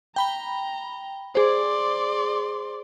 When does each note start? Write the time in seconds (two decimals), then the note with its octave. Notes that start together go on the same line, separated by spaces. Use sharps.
0.16 G5 A#5 B5 G7
1.35 G#4 C5 D5 C6